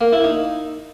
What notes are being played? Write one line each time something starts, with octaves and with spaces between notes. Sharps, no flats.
A#3
E4
D#4